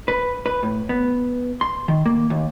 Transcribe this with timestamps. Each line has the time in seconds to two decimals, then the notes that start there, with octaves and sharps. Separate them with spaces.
0.08 B4
0.46 B4
0.63 A2
0.89 B3
1.61 C6
1.88 D#3
2.06 A#3
2.30 D#2